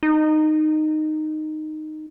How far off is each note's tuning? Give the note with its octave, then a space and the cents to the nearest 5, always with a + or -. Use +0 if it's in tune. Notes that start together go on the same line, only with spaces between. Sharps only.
D#4 -10